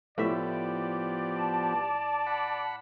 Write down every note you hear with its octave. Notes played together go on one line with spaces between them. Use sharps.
A2 F3 B3 G4 D5 E5
A5
F#5 B5